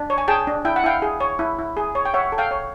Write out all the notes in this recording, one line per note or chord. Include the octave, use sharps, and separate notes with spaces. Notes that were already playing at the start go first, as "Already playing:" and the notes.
Already playing: D4
C#5
G#5
G#4 G5 A5
D4
E4 G5
F#5
E4 F5 G5
G#4
C#5
E4
E4
G#4
C#5
G5
C#5 E5 F#5
A4
F5 G5
C#5